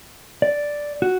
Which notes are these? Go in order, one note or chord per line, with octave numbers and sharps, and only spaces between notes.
D5
F#4